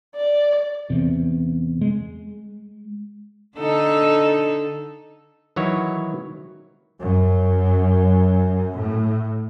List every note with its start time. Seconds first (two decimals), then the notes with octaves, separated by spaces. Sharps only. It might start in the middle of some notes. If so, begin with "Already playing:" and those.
0.16 D5
0.90 E2 C3
1.81 G#3
3.58 D3 D#4 A4
5.56 D#3 E3 F#3 E4 F#4 C#5
6.99 F#2
8.76 A2